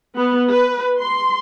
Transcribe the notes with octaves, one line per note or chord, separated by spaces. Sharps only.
B3
B4
C6